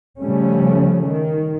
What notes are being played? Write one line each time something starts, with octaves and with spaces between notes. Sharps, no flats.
C#3 F3 G3 A3 C#4
D#3